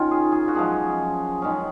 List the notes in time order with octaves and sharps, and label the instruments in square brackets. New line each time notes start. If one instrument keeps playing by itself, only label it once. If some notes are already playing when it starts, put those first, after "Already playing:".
Already playing: [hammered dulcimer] D#3 C#4 F4
G#4
G#4
F#4
F#2 F3 G#3 G#4
D#3 G#3 C#4